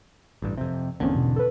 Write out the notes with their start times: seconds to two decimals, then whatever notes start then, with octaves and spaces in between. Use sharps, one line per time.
0.42 A1 G2
0.57 F2 C3
1.00 G#1 E2 D3 A#3 C4 C#4
1.16 B2
1.36 A4 B4